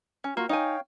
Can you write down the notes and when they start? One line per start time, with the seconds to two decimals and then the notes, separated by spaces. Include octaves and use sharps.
0.24 C#4
0.37 A#3 F4 F#4
0.49 D#4 C#5 F5 G5 G#5